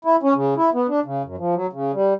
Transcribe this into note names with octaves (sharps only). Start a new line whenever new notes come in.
E4
C#4
C#3
E4
B3
D4
C#3
F#2
F3
F#3
C#3
G3